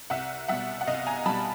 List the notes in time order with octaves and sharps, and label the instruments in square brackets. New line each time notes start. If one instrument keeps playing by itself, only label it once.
[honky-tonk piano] C2 E5 F#5
B2 G3 E5 F#5
F#5
C2 D#5 F5
G#5 A#5
B2 G3 A5 B5